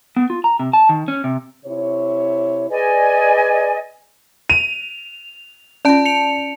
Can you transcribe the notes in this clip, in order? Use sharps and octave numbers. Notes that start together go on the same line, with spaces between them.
B3
F4
A#5
C3
A5
D#3
C#4
C3
C3 E4 C#5
G#4 B4 D5 D#5 G#5
D#7 F7
C#4 F4 D5 A5 D7
C#7 F7